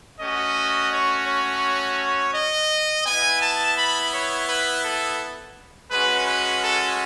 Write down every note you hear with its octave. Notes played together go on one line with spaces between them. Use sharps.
A3 C#4 F#4 D#5
C#5
C#5
D#5
B3 E4 G#5
A5
B5
C#5
B4
A4
G#3 C#4 F#4 B4
B4
A4